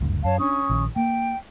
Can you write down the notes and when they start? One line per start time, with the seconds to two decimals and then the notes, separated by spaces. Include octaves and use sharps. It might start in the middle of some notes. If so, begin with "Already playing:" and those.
0.01 F#1 D2 G2
0.25 F#2 C#5 F5 A5
0.40 C#4 D4 C#6 D#6
0.69 A#1 D#3
0.96 A#3 G5